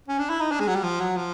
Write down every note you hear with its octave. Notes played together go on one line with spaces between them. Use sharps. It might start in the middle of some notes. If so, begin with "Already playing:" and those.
C#4
D4
E4
D#4
D4
G#3
F#3
G3
F3
F#3
F3